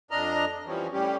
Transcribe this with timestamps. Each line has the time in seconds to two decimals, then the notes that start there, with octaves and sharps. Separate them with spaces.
0.11 F2 D4 D#5 A#5 F6
0.66 E3 F3 G3 C4 C#4
0.92 A2 G3 C#4 G4